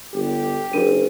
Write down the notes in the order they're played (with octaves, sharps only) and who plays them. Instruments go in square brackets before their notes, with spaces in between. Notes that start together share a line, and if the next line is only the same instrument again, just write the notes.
[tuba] G1 [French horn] G4
[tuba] F#1 [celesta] D4 A#4 D#7